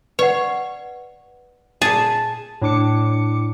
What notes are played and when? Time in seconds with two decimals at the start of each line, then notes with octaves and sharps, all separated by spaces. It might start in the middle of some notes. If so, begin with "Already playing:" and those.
0.19 B4 C#5 D5 F#5
1.82 A#2 G#4 A5
2.61 A2 D4 D6 C#7